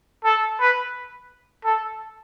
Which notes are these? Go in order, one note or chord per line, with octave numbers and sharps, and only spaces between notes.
A4
B4
A4